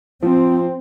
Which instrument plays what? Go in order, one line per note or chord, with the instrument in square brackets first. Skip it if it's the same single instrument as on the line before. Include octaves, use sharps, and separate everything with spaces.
[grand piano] F3 [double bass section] C4